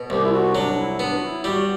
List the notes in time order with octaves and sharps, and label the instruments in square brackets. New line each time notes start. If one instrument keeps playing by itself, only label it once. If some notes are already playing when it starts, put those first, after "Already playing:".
Already playing: [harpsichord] B2
[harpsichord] C2 [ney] G4
[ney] E4
F#4
[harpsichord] F#3 [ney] D4
[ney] E4
[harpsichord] B3 [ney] D4
[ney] F#4
E4
[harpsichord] G3 [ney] F#4